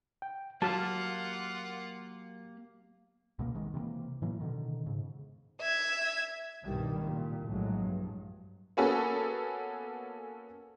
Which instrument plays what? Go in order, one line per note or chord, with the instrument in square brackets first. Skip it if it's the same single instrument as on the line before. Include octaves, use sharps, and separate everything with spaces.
[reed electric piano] G5
[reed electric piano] F#3 [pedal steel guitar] A#3 G4 F6 [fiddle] F4 F#5 [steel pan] A5
[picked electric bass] C#2 B2 F#3 A#3
B1 C3 D#3 G#3
C3 E3 G3 A#3
A2 E3 F#3 A#3
B2 D3 D#3
G#2 C#3
[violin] E5 G#6
[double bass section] C2 G2 B2 D#3 G3
A#2 G3
A#1 A2 F#3 G#3
G2
[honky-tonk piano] A#3 B3 C#4 F#4 G#4 A4